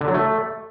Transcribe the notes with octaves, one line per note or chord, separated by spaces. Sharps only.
D3
F#3
A3